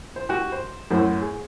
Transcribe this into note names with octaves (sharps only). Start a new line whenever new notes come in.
C5
F#4 G4
C5
F#2 A2 C5
G#4